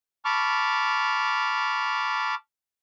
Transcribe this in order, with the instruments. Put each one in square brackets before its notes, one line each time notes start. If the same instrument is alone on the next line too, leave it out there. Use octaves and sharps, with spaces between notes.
[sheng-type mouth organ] A5 B5 C#6 D6 F6